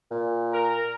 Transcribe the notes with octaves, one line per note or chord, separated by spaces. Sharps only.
A#2
A#4